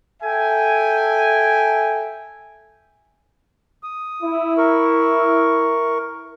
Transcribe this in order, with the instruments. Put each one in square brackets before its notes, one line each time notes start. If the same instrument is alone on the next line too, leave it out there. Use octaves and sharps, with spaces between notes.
[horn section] A4 E5 G5 G#5
[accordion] D#6
[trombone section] E4
[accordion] A#4 C#6